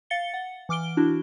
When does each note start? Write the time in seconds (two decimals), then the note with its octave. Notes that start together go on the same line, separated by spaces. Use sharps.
0.10 F5 A6 C#7 G7
0.34 F#5
0.69 E3 D6 F6 D7 G7
0.97 D4 E4 F#4